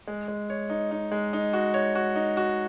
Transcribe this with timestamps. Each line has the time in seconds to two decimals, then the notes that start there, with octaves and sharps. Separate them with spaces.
0.08 G#3
0.28 G#3
0.50 C#5
0.70 D#4
0.91 D#4
1.12 G#3
1.33 D#4
1.53 F#4
1.74 C#5
1.95 F#4
2.16 D#4
2.37 F#4